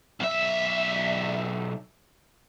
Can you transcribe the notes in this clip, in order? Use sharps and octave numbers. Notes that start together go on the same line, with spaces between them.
B1 E5